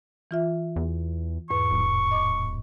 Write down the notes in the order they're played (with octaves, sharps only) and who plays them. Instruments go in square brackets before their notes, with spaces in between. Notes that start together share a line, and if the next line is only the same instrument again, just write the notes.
[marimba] E3 F4 E5
[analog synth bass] E2
[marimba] E2 G#2 B4 [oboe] C#6
[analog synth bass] D1
[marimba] D#5 D6